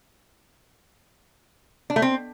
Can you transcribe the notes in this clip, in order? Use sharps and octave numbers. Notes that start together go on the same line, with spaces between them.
D4
A3
C4